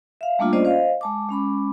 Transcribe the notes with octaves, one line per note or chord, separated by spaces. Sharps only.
E5 F5
G3 A3 A#3 D4 F4
C#4 F4 C5 D5 D#5
C5 D#5 F5
G#3 A5 D6
G#3 C#4 B5 D6